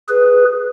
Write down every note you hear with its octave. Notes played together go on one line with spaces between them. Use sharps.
G#4 B4